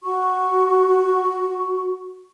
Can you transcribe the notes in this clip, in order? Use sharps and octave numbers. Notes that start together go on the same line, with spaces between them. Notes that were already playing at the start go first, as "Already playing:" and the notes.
F#4 C#6